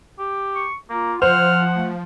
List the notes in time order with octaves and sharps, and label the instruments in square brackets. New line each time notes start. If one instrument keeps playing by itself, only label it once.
[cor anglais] G4
[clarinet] C#6
[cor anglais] A#3 [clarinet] F4
[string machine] F3 [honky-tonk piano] C5 [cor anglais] F#5 [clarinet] F6
[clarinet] A3